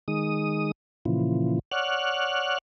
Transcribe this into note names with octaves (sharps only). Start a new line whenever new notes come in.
D#3 G#3 D#6
A#2 C#3 E3 F3
C#5 D5 F#5 F6 F#6